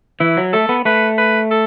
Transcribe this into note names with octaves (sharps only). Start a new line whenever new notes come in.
E3 E4
F#3
A3 A4
B3
A3 B4
B4
A4